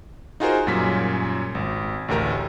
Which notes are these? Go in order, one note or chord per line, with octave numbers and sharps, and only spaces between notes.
D#4 F4 F#4 G#4 A#4 C5
F#2 A#2 G3 C#4 B6
G#1
A1 D2 G4 A#4 A#5